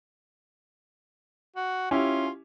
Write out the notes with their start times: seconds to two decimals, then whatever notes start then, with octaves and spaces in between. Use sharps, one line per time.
1.56 F#4
1.91 C#4 E4 F4 G4